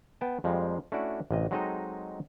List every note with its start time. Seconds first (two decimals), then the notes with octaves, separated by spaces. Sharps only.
0.21 B3 G5 A5
0.44 F2 F3 G3 G#3 C4
0.92 A3 C#4 D4 E4 F#4 D5
1.31 A1 C3 D#5
1.51 F#3 G#3 C4 D#4 A4 D#5